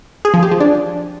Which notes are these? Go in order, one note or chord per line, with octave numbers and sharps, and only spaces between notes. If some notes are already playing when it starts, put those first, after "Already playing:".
G#4
F3
G4
F3
D4